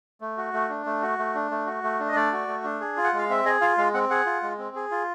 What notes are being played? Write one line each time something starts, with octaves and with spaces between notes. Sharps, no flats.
A3
F#4
A3
D4
A3
F#4
A3
D4
A3
F#4
A3
D4
D#5
A3 D5
F#4
A3
D4
G#4
F4
F#5
G#3
F5
C4 E5
G#4 D#5
F4 F5
G#3 F5
C4 F#5
G#4 F#5
F4
G#3
C4
G#4
F4